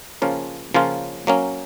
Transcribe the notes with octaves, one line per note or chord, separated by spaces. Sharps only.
C#3 F3 A#3 C#4 F4
C#3 F3 A#3 C#4 F4
F#3 A#3 C#4